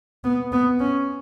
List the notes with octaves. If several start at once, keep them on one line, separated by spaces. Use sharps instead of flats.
B3
B3
C#4